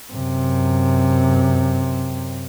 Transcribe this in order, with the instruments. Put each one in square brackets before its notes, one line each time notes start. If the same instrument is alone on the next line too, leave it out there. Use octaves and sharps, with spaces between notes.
[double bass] F#2 C3